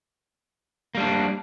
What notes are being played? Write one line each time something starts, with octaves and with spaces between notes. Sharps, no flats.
G3 A#3 D4